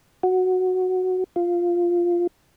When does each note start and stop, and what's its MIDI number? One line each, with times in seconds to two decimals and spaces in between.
0.23 1.24 66
1.36 2.27 65